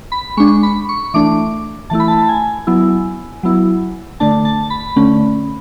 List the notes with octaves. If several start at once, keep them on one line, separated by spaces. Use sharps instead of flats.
B5
G#3 D4 C#6
B5
C#6
E3 A3 D4 D6
E3 A3 E4 A5
B5
A5
A5
G#5
F#3 B3 E4
F#3 B3 E4
D3 A3 D4 A5
A5
B5
D3 A3 C#4